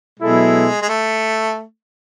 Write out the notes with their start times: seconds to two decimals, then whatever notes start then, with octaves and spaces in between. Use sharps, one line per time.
0.19 B2 F#3 G#3 B3 E4 A4
0.82 G#3
0.88 A3